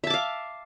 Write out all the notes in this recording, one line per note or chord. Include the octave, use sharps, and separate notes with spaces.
E5 F5 A5 D6